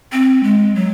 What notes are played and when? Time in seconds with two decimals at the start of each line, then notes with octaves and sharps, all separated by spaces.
0.12 C4
0.43 G#3
0.75 F#3